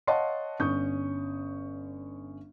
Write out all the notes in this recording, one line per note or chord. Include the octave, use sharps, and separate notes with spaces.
C#5 D#5 F5 F#5 A5 C6
G1 C#4 C#6 D#6 G6